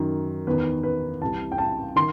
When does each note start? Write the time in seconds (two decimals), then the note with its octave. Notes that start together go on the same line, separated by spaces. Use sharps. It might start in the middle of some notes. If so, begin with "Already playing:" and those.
Already playing: F#2 D#3
0.47 E2 D#3 B4
0.83 B4
1.21 C2 C3 E3 A5
1.52 G5
1.58 A5
1.96 D#3 C6